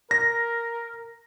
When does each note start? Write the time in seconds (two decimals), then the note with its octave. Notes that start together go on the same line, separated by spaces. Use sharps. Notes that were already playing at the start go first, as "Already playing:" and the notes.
0.11 A#4 A#6